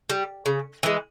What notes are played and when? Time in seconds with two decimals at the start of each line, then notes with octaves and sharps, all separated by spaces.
0.10 G3
0.46 C#3
0.83 E3 G#3